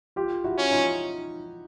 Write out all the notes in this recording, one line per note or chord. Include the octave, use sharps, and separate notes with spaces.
F4 G4
E4 F#4
C#4
D#4 F4